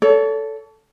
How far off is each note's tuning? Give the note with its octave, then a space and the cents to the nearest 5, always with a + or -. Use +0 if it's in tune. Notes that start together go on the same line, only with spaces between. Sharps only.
A4 +0 C#5 +40